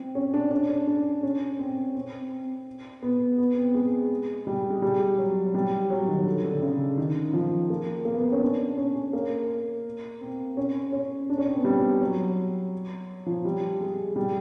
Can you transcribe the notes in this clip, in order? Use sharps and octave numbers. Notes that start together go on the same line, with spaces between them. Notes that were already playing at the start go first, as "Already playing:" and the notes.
Already playing: C4
C#4
D4
D4
C#4
D4
C#4
C4
C4
B3
B3
C4
G#3
G3
G#3
G3
F#3
G3
F#3
D#3
D3
D3
C#3
D#3
F3
A#3
A#3
B3
C4
C#4
D4
C#4
C#4
A#3
C4
C#4
C#4
D4
C#4
C4
B3
G3
F#3
F3
G3
G#3
G3